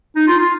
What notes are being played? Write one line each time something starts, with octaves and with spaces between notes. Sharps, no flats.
D#4
F4
F4